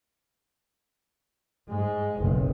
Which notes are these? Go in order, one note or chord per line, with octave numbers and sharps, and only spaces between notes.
G#2 G#3
F#1 B1